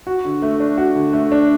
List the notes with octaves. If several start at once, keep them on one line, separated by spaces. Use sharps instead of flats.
F#4
D3
A3
D4
F#4
D3
A3
D4